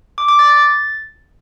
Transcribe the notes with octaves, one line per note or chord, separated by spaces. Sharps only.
D6
D6
A6
A6